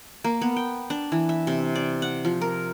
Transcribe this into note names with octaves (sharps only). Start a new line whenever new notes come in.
A#3
B3
G5
D4
E3
E5
C3
D5
F#5
F3
A#4